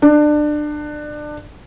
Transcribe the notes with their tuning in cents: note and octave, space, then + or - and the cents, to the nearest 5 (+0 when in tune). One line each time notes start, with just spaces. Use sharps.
D4 +25